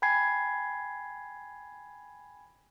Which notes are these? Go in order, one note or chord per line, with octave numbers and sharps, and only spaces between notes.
G5 G#5 B5 G#6 C7